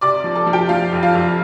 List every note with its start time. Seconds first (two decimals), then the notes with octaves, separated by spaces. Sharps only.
0.01 C3 D5 D6
0.24 F3
0.35 A4 A5
0.46 F3
0.53 G4 G5
0.69 F3 F4 F5
0.93 F2
1.03 F4 F5
1.14 F2